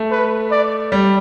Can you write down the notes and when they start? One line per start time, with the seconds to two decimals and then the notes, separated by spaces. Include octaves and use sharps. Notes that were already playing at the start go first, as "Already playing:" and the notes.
Already playing: A3
0.11 B4
0.51 D5
0.92 G3